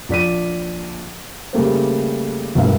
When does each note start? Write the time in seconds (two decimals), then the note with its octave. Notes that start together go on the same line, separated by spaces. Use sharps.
0.09 A#1 D5 B6 D#7
1.53 C#3 G3 A3 A#3 C5
2.55 E1 G2 A#2 E5 F5